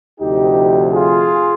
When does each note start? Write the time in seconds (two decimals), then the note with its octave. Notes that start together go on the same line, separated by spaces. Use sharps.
0.20 D2 C3 F3 D#4 G4
0.93 F4 G#4